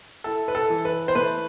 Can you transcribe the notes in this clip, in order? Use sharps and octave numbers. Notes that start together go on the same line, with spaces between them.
E4 A4
B4
A4
E3
B4
C5
A3 B4